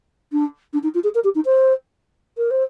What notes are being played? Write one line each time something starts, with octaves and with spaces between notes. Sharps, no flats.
D4
D4
D#4
F4
G#4
A#4
G4
D#4
C5
A#4
C5